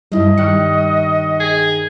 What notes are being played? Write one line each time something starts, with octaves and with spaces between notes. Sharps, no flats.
E2 G2 G3 E4 D#5
G2 D#3 G3 C#6 F#6 C#7
G#4